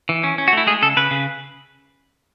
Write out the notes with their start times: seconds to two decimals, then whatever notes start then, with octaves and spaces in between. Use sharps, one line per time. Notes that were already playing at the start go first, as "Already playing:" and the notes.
0.09 E3
0.23 C#4
0.38 C#4
0.48 F#4
0.53 A3 E4
0.67 G#3 G#4
0.82 C#3 A4
0.97 C#3 B4
1.11 C#3